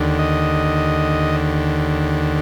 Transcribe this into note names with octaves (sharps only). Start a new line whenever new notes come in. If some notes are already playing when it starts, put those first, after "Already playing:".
Already playing: D#2 D3
D#5